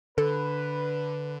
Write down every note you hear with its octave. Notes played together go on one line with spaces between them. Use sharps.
D3 A4 B4